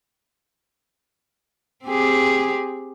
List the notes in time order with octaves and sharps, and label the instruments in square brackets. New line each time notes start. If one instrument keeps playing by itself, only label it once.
[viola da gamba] C4 G4 G#4